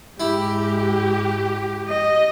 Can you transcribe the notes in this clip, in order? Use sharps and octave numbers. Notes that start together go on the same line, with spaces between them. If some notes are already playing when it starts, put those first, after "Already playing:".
G#2 G#3 E4 G4
D#5